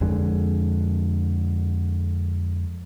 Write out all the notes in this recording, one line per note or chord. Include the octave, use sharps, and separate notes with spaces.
F2 D3 G#3